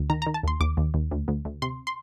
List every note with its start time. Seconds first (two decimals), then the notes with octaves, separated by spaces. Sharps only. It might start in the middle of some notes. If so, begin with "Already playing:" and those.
Already playing: D2
0.10 D#3 A#5
0.22 A#5
0.27 D#3
0.34 A5
0.43 D#2 C6
0.60 D#2 D6
0.77 D#2
0.94 D#2
1.11 D2
1.28 D2
1.45 D2
1.62 C3 C6
1.87 C6